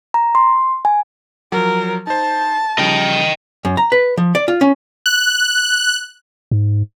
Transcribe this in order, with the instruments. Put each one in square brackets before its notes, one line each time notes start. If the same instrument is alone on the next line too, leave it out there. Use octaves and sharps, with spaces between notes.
[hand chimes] A#5
C6
G#5
[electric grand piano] F3 F#3 [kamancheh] A#4
[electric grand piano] D#4 C5 [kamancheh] A5
[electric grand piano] C#3 F3 G3 [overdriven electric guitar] D#5 G5
[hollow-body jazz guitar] F#2
A#5
B4
F3
D5
F4
C#4
[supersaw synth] F#6
[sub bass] G#2